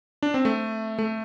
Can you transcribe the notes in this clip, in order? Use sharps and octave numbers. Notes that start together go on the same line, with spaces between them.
D4
C4
A3
A3